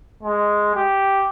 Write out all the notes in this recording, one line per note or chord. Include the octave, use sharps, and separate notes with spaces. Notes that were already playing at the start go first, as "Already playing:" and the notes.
G#3
G4